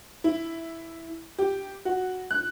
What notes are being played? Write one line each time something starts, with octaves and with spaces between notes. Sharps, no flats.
E4
G4
F#4
F#6